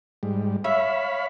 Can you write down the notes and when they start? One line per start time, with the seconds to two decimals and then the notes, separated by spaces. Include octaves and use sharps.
0.23 G#2 G3
0.64 C#5 E5 F5 B5